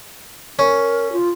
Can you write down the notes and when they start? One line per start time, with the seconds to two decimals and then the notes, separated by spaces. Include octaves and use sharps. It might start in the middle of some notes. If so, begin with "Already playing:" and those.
0.59 C#4 A#4
1.12 F4